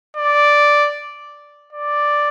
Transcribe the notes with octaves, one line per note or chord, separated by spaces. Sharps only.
D5
D5